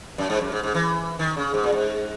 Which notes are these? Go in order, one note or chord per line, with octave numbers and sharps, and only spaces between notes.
F#2
G#2
F#2
G#2
G#2
E3
D#3
C#3
G#2
A#2
G#2